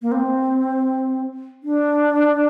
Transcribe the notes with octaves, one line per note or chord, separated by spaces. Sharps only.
A#3
C4
D4